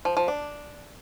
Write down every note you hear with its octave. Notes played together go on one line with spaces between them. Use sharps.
F3
F3
D4